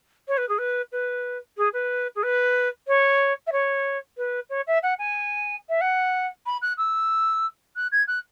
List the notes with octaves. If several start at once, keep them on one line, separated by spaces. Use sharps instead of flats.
C#5
B4
G#4
B4
B4
G#4
B4
G#4
B4
C#5
E5
C#5
B4
C#5
E5
F#5
G#5
E5
F#5
B5
F#6
E6
F#6
G#6
F#6